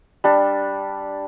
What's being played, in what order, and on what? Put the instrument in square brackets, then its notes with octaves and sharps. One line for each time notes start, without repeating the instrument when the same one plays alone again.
[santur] G3 D4